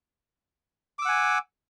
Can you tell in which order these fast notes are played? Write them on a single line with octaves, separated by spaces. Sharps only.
D6 E6 F#5 G#5